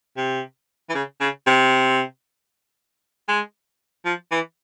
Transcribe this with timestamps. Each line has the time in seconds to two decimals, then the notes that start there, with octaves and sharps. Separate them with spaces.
0.17 C3
0.89 E3
0.94 C#3
1.20 C#3
1.47 C3
3.28 G#3
4.05 F3
4.31 E3